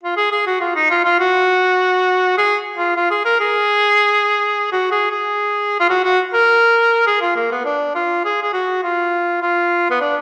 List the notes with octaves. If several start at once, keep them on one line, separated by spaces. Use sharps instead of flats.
F4
G#4
G#4
F#4
F4
D#4
F4
F4
F#4
G#4
F4
F4
G#4
A#4
G#4
F#4
G#4
G#4
F4
F#4
F#4
A#4
G#4
F4
A#3
B3
D4
F4
G#4
G#4
F#4
F4
F4
B3
D4